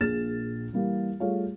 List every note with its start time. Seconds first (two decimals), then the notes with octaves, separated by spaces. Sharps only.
0.01 A#1 A#2 G#4 F6 A6 E7
0.73 E3 G3 A#3
1.20 G3 A3 F4 G#4 C#5 F5